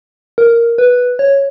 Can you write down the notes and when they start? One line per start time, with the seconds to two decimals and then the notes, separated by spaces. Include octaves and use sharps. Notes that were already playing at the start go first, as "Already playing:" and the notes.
0.38 A#4
0.78 B4
1.19 C#5